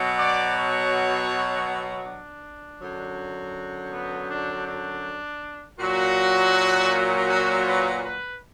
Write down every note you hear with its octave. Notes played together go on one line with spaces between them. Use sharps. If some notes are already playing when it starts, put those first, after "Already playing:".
Already playing: B2 F#3
D5
C#5
D4
F#2 D3 F#3
B3
D4
D4
A#2 F#3 F#4
F#4
B4
B4